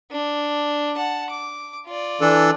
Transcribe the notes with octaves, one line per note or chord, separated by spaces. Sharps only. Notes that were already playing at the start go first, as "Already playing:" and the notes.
D4
F#5 A5
D6
F4 D5
E3 D4 A4